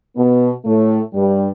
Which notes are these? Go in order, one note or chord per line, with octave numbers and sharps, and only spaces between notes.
B2 B3
A2 A3
G2 G3